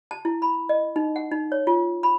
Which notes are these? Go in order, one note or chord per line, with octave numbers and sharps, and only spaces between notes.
A5
E4
B5
D#5
D#4
F#5
D#4
C#5
F4
B5